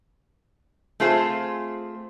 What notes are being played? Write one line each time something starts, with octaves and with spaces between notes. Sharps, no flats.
A3 C4 F4 G#4 C5